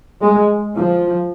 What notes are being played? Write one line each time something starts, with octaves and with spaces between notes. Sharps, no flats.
G#3
F3